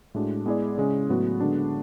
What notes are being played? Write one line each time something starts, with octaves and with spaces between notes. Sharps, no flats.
A2 G#3 D4 F#4
G#3 B3 E4 G#4 D5
C#3 G#3 C#4
A2 F#3 B3 F#4
D3 G#3 B3 D4 F#4